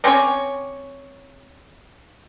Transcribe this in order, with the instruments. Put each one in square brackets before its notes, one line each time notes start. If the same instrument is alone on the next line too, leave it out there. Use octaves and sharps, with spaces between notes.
[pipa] C4 C#4 G4 C#5